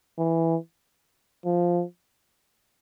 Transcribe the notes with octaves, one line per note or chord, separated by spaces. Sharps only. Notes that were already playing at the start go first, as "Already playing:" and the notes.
E3
F3